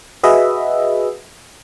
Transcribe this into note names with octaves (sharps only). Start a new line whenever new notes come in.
F#4 G#4 B4 D#5 E5